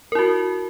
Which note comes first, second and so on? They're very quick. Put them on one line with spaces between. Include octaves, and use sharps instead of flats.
A#4 E4 F#4